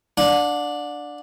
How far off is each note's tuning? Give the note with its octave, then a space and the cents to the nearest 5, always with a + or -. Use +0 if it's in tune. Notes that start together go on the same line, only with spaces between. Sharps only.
D4 +0 F#5 -40